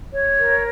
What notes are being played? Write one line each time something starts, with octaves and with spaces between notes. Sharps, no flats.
C#5
A#4